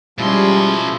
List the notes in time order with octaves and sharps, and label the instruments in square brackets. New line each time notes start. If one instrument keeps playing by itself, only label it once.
[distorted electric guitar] B2 C6 [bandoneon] F3 E4 [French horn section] G3 [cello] G#3 C#4